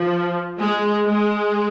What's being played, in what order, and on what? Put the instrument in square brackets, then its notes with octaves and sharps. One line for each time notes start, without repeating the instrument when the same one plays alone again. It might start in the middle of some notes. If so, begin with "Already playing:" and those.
Already playing: [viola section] F3
G#3
G#3